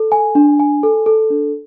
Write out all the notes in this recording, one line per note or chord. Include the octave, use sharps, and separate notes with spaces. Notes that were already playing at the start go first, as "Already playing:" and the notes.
Already playing: A4
G#5
D4
G#5
A4
A4
D4